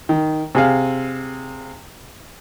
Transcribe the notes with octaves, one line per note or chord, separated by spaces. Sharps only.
D#3
C3 G#4 F5